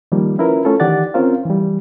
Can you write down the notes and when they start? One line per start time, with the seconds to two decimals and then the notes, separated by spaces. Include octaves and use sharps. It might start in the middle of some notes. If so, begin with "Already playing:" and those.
0.12 D#3 F3 G3 A#3
0.39 C#4 E4 F4 A#4 B4
0.65 A3 C#4 F4 A4
0.80 D#3 E3 G4 D5 F#5 A6
1.14 C4 C#4 F4 A#4 C5 F5
1.46 E3 G3